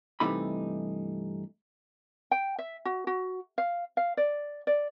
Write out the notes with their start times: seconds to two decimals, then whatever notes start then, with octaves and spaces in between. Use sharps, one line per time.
0.20 G2 C3 E3 A3 D#4 B5
2.31 G5
2.58 E5
2.85 F#4
3.07 F#4
3.58 F5
3.97 F5
4.17 D5
4.67 D5